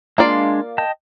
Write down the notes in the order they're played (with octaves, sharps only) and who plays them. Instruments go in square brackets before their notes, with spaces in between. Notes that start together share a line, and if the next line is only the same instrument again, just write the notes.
[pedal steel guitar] G#3 D4 C6 [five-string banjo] A#3 F4 D5
[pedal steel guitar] D#5 G5 A5